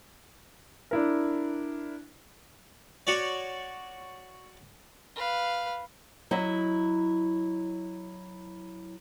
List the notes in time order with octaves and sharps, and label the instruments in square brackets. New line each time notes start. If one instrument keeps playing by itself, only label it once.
[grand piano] D4 E4 A#4
[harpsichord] F#4 C#5 D5
[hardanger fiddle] B4 F5
[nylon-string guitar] F#3 E4 D#5 E5